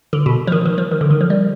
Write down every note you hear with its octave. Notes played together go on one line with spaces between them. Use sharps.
D3
B2
F3
D#3
D#3
F3
D#3
D3
D#3
F3
G3